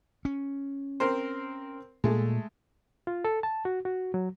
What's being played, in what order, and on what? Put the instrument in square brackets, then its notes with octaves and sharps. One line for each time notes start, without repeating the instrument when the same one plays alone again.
[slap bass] C#4
[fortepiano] C4 A#4 C5
[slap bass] A#2 [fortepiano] G#3 A3
[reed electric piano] F4
A4
A5
F#4
F#4
F#3